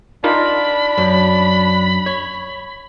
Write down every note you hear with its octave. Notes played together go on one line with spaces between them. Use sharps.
D4 D#4 F4 A#4 B5
F#2
C#5